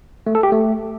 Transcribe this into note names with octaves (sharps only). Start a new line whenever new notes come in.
A3
A4
G4
A3